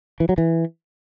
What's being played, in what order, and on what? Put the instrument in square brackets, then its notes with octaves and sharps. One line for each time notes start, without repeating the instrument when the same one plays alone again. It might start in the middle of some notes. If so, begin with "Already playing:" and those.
[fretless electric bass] E3
F#3
E3